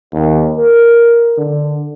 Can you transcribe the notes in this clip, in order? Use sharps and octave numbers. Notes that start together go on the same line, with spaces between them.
D#2
A#4
D3